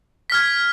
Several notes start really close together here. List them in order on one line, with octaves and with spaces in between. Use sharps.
B6 F6 G#6